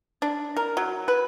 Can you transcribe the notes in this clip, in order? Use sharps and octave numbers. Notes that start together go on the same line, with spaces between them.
D4
A#4
F#3
B4